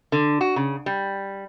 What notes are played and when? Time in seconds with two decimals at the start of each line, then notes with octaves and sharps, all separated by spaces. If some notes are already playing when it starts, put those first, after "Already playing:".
0.12 D3
0.41 F#4
0.56 C#3
0.86 G3